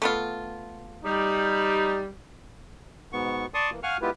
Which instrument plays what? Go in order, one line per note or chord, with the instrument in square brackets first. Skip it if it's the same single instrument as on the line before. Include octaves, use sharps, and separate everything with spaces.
[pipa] A3 B3 F4
[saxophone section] G3 [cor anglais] D#4
[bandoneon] G#2 B2 B3 C#6
D5 A5 C6 C#6 D#6
E3 A#3
F5 F#5 G#5 C#6 F6
G#3 B3 E4 F4 G4 B4